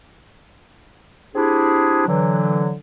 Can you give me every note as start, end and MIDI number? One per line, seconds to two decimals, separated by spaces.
1.35 2.05 60
1.35 2.05 62
1.35 2.05 64
1.35 2.05 67
1.35 2.05 68
2.07 2.73 50
2.07 2.73 52
2.07 2.73 54